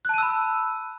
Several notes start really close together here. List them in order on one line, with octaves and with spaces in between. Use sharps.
F#6 A5 D#7 E6 B5